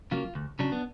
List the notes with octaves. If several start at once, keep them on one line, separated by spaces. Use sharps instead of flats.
C#3 F#3 A#3 F4
D2
C#3 F#3 D4
B3